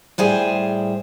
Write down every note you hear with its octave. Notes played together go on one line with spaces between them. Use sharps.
A2 G3 G#4 C5